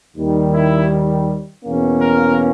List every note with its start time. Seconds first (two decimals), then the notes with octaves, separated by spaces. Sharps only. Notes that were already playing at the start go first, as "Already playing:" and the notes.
0.17 D#2 D#3 G3
0.54 E4
1.64 E2 B2 A#3 C#4
2.01 A#4